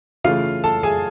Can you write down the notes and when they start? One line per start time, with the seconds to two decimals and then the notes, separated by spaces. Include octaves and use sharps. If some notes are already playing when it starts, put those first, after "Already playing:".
0.24 C#3 E3 A3 F4 F5
0.64 A4 A5
0.83 G#4 G#5